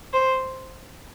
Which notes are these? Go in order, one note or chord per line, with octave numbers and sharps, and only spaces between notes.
C5